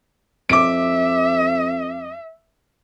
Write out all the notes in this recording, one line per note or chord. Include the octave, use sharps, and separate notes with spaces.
F2 E5 D6 D7